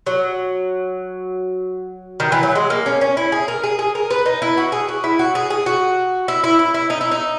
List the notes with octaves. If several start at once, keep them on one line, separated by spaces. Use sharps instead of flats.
F#3
D#3
E3
F#3
G#3
A#3
C#4
C#4
E4
G#4
A#4
G#4
G#4
A#4
B4
D#4
E4
F#4
G#4
F#4
E4
F#4
G#4
G#4
F#4
E4
E4
E4
E4
D#4
E4
D#4